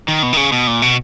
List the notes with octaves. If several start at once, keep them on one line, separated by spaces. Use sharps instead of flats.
D#3
B2
D#3
C#3
B2
A#2
B2